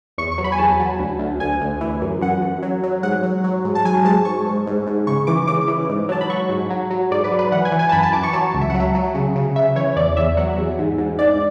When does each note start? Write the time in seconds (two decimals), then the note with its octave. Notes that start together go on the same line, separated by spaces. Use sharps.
0.18 E2 C#6
0.32 C#6
0.38 F#3
0.44 B5
0.52 G#5
0.58 E2 A5
0.80 F#3
0.99 D2
1.19 D2
1.40 D2 G#5
1.60 D2
1.81 E3
2.01 F#2
2.21 F#2 F#5
2.42 F#2
2.63 F#3
2.83 F#3
3.03 G#2 F#5
3.23 F#3
3.44 F#3
3.64 G#2
3.75 A5
3.85 F#3 G#5
4.05 G#2 A5
4.25 G#2 C#6
4.46 G#2
4.67 G#2
4.87 G#2
5.07 C#3 C#6
5.27 E3 D6
5.47 C#3 D6
5.68 E3
5.89 G#2
6.09 F#3 A5
6.21 B5
6.30 F#3 C#6
6.49 G#2
6.70 F#3
6.91 F#3
7.11 G#2 D5
7.24 B4
7.32 F#3
7.39 B4
7.52 E3 F#5
7.65 G#5
7.72 E3
7.79 G#5
7.89 A5
7.92 F#2 B5
8.03 A5
8.13 E3 D6
8.23 C#6
8.33 F#3 A5
8.54 C#2
8.61 E5
8.70 F#5
8.74 F#3
8.80 E5
8.95 F#3
9.14 C#3
9.36 C#3
9.56 C#3 E5
9.76 E3 C#5
9.96 E2 D5
10.17 E2 E5
10.37 F#3 F#5
10.58 E2
10.79 G#2
10.98 G#2
11.19 G#2 D5